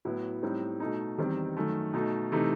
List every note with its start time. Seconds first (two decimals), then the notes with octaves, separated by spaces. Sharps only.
0.05 A2 F#3 B3 E4
0.42 A2 G3 C4 D#4
0.80 B2 A3 D#4
1.18 E2 D#3 G3 C4
1.57 F#2 D#3 A3
1.93 B2 A3 D#4
2.32 C3 E3 A3 D#4